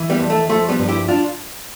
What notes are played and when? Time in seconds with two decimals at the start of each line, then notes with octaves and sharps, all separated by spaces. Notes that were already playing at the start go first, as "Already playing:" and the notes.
Already playing: E3
0.10 G3 B3
0.20 F2
0.30 A3
0.49 F3 A3
0.69 G3 B3
0.79 G2
0.89 E4 G4
1.08 D4 F4